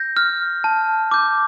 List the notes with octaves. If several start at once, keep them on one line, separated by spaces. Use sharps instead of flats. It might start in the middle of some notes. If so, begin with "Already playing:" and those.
Already playing: G6 A#6
F6
A5
D6 G6